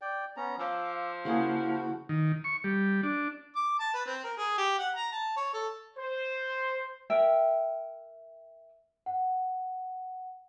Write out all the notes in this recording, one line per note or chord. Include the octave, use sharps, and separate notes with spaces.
D5 G5
B3 C#4 A#5
F3 F5 D6 E6
C#3 A#3 E4 F#4 G#4
D#3
C#6
G3
D4
D6
A5
B4
C4
A#4
G#4
G4
F#5
A#5
A5
C#5
A4
C5
A#4 E5 G5
F#5